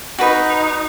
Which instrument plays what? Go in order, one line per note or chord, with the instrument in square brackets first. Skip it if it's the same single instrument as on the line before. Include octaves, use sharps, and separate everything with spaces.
[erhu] D#4 [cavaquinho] F#4 B4